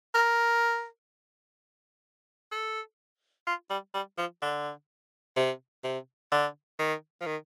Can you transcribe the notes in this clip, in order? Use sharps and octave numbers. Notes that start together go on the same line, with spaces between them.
A#4
A4
F4
G3
G3
F3
D3
C3
C3
D3
D#3
F3
D#3